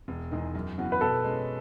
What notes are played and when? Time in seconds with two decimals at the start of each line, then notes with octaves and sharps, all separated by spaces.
0.08 E1
0.31 E2 D#3 G#3 D#4
0.55 F#2
0.78 C#3 E3 B3 F#4
0.92 B4
1.01 B2 A4
1.24 G#3 C#4